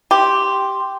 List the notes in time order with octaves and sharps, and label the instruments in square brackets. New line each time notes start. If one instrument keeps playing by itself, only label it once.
[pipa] G4 [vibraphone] C6